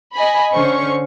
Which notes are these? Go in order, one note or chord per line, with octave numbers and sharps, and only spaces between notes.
D#5 G#5 B5
D3 C#4 C5 C#6